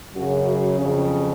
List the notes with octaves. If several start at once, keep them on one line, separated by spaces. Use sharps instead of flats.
F#2 C#3 F#4
F2 C#3